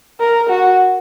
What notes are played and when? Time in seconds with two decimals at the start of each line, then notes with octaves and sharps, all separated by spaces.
0.20 A#4
0.50 F#4